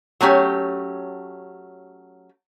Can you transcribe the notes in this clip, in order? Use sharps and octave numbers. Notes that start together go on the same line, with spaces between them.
F#3 A3 C#4 G4